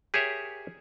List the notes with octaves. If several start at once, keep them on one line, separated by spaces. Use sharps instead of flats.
G4 G#4 A#4 C#5 E5